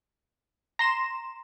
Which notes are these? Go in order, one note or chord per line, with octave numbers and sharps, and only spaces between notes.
A#5 C6 E7